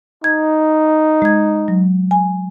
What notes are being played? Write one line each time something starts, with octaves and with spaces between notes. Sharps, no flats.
D#4 G#6
G#3 G#6
F#3
G#5